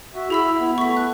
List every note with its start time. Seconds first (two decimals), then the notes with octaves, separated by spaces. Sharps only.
0.14 F#4 E5
0.30 E4 G#4 B5 E6
0.59 B3 E4
0.78 A3 C#6 B6
0.97 F#6